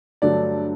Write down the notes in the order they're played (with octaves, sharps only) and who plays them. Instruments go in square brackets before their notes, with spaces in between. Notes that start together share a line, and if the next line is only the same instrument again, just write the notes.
[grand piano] G2 D3 F#3 A3 D5